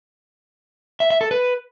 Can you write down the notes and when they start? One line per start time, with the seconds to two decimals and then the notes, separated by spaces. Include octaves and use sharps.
1.00 E5
1.11 E5
1.21 A4
1.31 B4